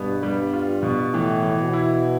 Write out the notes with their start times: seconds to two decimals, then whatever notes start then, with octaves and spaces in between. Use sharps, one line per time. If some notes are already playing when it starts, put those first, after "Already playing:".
Already playing: G2 B2 B3
0.23 G3
0.53 F4
0.83 B2
1.14 A2 E3
1.43 E3
1.59 B2
1.73 E4